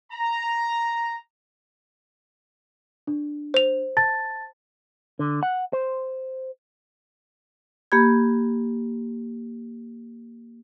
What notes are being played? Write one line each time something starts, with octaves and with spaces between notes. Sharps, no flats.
A#5
D4
C5 F7
A5 A6
D3
F#5
C5
A#3 G4 B5 G#6